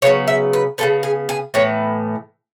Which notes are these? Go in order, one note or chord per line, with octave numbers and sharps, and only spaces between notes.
C#3 F#3 B3 C#5
E5
B4
C#3 F#3 B3 A4
G#4
G#4
A2 E3 B3 C#5